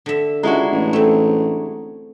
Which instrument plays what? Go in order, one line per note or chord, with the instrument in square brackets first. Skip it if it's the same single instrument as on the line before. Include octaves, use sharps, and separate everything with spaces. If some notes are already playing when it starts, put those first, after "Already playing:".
[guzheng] D3 E5
[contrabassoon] C#2 [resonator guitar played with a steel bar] G#3 E4 F#4 [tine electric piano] D4 A#5
[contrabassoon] A1
[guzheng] A3 C4